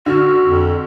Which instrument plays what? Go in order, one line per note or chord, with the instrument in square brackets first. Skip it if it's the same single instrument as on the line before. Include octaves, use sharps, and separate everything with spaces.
[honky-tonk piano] D3 F6 [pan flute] F#4
[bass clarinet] F2